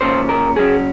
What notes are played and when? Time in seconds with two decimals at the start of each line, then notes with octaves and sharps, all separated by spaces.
0.01 C#3 F3 A#3 C#4 C5
0.29 A#4
0.56 C#3 F#3 C#4 G#4